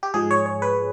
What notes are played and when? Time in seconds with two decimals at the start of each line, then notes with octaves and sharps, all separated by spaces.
0.03 G4
0.14 G#2 F3 G#3 G#4
0.31 C#5
0.46 C#5
0.62 B4